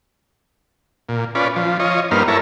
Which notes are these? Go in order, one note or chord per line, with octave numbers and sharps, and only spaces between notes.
A#2
C#4 F4 B4 D5
F3
F4 C#5 D#5
G2 A#3 B3 D#4 C5 F6
E4 A4 A#4 C#5